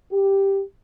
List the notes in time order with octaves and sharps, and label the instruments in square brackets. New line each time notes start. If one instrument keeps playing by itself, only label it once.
[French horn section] G4